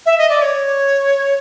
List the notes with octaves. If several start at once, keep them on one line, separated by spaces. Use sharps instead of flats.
E5
D#5
D5
C#5